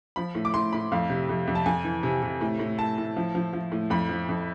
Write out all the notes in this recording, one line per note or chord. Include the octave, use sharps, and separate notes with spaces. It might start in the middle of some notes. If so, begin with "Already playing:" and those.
F3 B5
A2
D6
A2 C6
A2 B5
F2 F5
C3
F2
F2
A5
F2 G#5
E3
C3
C3
A2
A2
A2 A5
A2
F3
F3
F3
A2
F2 B5
F3
F2